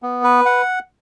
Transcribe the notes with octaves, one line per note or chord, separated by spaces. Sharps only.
B3
B4
F#5